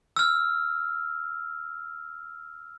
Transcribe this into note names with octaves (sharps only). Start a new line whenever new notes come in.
E6 F6